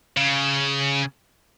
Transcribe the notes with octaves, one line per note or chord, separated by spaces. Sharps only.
C#3